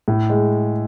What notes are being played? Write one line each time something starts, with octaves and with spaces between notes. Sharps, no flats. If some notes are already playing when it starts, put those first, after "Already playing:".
A2
G#3